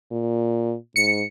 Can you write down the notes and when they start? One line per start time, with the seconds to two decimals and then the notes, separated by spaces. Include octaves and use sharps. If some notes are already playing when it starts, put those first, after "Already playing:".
0.12 A#2
0.96 G#2 C#7